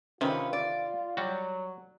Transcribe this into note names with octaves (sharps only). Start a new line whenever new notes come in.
C3 D#3 C#4 F4 B4
D5
F#3 G3 F#4